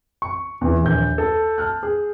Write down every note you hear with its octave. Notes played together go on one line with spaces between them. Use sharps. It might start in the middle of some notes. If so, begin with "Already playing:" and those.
C#6
E2 E3
A#1 D#2 G6
A4
A5 F6 F#6
G#4